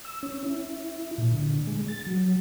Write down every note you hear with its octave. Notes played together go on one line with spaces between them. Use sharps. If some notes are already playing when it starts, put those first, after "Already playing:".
E6
C#4
E4
A#2
D3
G#3
A6
F#3